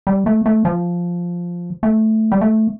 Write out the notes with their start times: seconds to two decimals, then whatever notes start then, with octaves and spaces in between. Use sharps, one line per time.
0.07 G3
0.26 A3
0.46 A3
0.65 F3
1.83 A3
2.32 G3
2.41 A3